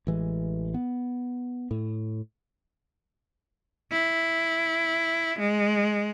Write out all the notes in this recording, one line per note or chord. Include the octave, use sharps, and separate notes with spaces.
A1 E3 G#3
B3
A2
E4
G#3